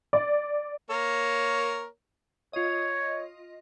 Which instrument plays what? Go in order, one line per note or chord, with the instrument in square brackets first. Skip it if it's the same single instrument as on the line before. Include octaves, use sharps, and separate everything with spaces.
[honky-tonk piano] D5
[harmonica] A#3 A#4 C#5
[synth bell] F4 D#5 [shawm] C#5